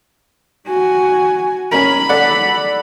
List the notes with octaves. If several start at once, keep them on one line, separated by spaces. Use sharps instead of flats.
F#4 G#5
C#4 A#4 B5
A4 D5 F#5